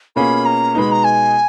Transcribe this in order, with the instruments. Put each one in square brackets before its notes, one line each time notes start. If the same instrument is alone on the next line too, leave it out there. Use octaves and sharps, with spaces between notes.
[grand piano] B2 A#3 C#4 F4 G#4 [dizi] B5
[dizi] A#5
[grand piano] B2 G#3 B3 D#4 [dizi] B5
[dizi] A#5
G#5